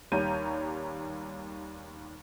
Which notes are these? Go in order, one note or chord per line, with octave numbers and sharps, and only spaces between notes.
D#2 G3 C#5 A#5 G6 D#7